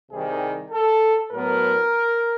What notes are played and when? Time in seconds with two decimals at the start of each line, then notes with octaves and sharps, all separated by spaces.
0.10 C2 C3 D#3 G3 G#4
0.71 A4
1.31 A2 F#3 B3 A#4